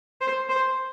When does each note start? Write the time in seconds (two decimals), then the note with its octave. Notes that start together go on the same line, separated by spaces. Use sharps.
0.21 C5
0.49 C5